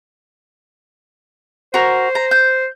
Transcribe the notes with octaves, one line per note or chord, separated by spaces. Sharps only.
F#4 A#4 C5
A#5
G6